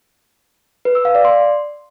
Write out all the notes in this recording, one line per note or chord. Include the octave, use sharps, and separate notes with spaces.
B4
E6
F5
D5
C6